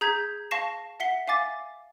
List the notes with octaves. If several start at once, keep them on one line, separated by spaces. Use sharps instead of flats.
G#4 A#5 G6 G#6 B6
F5 A5 C#6 A#6 C7 E7
E5 F#5 B6 C7 G7
E5 F5 G#5 D6 A6